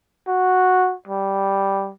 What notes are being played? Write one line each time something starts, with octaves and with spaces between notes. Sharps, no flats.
F#4
G3